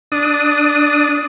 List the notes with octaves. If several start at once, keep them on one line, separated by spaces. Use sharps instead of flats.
D4 D#6